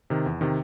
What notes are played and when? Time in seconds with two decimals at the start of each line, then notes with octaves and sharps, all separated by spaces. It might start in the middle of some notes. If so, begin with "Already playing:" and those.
0.10 C3 D#3
0.26 E2
0.41 C3 D#3